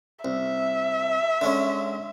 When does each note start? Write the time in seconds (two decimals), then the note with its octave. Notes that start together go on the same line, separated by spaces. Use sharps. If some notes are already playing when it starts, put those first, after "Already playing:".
0.25 C2 E5
1.41 D3 G#3 C#4